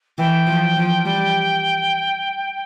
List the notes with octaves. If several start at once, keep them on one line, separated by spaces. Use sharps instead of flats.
E3 G5
F3
F3
G3